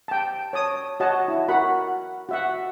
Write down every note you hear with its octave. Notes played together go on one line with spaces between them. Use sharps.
G5 A5
C#5 A5 D#6
F#4 C#5 D#5 F#5 A5
E4
F#4 A#4 F#5 B5
F#4 E5 F#5